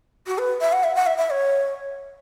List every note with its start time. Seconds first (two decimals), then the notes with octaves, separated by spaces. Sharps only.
0.27 F#4
0.38 B4
0.61 E5
0.73 F#5
0.84 E5
0.95 F#5
1.06 E5
1.18 E5
1.30 C#5